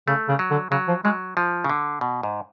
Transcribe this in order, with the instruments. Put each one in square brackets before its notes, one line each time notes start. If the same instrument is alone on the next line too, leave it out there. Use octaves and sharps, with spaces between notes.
[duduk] C#3 [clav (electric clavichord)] A3
[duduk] C#3
[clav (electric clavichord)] F#3
[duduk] D3
[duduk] C#3 [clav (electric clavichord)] F#3
[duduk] F3
[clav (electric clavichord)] F#3 [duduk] G#3
[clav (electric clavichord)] F3
C#3
D3
B2
G#2